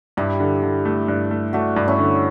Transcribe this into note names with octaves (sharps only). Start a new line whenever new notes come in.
G2 E4 G4
D3
D3
A3
G2
A3
A3 D4 F#4
G2
C#4 E4
D3